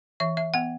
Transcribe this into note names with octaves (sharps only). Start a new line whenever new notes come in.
E3 E5
E5
B3 F#5